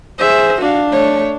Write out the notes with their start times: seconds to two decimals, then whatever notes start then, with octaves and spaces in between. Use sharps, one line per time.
0.19 G#4 C5 E5
0.61 D4 F#4 F5
0.90 A3 C#5